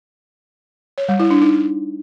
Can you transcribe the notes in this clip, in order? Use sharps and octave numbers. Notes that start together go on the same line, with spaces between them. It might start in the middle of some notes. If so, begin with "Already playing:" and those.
C#5
G3
E4
D4
D#4